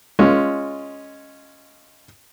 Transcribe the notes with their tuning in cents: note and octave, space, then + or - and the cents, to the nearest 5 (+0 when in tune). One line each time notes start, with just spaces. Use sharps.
G#3 +0 C#4 +0 F4 +0